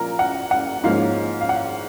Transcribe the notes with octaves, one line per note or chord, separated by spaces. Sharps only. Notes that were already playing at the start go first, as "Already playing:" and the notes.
Already playing: A#2 F3 A#4 A#5
F#5
F#5
G#2 F3 A#3 C#4 F5
F5
F#5